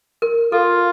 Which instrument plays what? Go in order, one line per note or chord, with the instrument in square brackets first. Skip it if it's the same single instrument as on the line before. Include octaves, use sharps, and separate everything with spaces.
[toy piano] A#4
[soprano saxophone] F4 [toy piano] A4